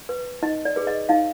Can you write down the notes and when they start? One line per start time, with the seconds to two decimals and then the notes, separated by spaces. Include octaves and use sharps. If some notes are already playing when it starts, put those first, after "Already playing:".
0.09 B4
0.43 D#4 D#5
0.65 D5
0.76 G#4 B4
0.87 D#5
1.09 D#4 F5